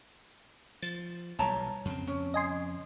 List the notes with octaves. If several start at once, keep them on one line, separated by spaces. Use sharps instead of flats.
F3 A6
B1 E3 G3 C#5 A5 A#5
F2 C#3 C4
C#4
D#5 G#5 C6